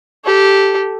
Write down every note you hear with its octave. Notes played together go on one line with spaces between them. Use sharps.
G4 A4